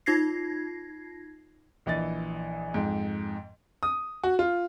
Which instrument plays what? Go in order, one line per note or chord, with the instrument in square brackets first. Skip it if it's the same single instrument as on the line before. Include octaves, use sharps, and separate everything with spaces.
[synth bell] D#4 F4 G#6 A#6 C7
[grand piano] A#1 E3 D#5 A6
F2 G#2
D#6
F#4
F4